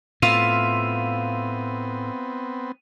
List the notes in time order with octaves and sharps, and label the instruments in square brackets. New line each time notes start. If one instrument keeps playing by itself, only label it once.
[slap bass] A2 [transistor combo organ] B3 C4 [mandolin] F4 E5 F5 [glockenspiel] D#7 F7